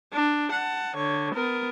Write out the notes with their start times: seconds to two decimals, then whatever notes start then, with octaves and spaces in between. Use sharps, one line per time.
0.13 D4
0.52 F#5 A5
0.96 D3 C#5
1.34 B3 A#4